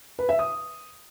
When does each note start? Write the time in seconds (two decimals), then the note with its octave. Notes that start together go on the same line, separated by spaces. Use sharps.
0.19 B4
0.29 E5
0.39 D#6